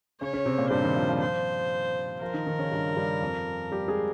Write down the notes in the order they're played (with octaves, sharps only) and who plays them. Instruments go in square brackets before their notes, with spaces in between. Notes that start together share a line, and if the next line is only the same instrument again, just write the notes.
[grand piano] C#3 C#4 [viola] C#5
[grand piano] C#3 C#4
C3 C4
A#2 A#3
[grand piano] G2 G3 [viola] C5
[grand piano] D#3 D#4
F3 F4
F3 F4
[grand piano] F3 F4 [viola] C5
[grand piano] F3 F4 [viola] A#4
[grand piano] D#3 D#4
D#3 D#4
C#3 C#4
G2 G3
G2 G3
F2 F3
G3 G4
G#3 G#4